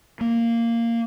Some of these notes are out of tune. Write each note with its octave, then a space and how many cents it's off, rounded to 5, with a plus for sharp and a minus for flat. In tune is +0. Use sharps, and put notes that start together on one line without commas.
A#3 -10